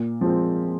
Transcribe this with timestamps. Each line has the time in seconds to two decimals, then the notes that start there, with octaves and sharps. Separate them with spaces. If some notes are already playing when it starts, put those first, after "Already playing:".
Already playing: A#2
0.21 F3 G#3 C4